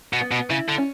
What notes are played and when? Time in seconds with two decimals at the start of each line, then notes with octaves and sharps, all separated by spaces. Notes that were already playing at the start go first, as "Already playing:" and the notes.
0.13 B2
0.21 B3
0.31 B2
0.50 C#3 E4
0.68 D3
0.78 C#4